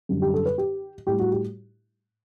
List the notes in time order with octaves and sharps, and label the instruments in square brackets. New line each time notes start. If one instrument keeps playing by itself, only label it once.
[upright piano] F#2 D3 G3
G4
A4
B4
G4
A2 G3 G4
F#4
G4